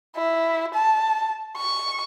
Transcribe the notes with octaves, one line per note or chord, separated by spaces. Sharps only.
E4
A5
C#6